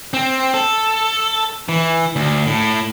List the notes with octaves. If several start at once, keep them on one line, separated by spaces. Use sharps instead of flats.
C4
A4
E3
D2
A2